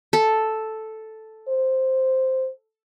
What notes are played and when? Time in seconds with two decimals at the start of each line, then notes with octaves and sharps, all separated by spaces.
0.13 A4
1.48 C5